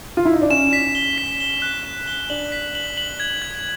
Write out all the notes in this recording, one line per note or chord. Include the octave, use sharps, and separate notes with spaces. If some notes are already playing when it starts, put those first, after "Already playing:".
F4
E4
D#4
D4
C#4 E7
B6
G7
B6
G7
F#6
E7
G7
D4 F#7
B6
F#7
F#7
G#6
G#6